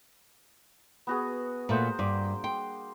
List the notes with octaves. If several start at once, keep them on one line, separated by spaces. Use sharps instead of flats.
B3 F#4 G#4
A#2 A3 A#3 C5 F#5
G2 D6
G5 C6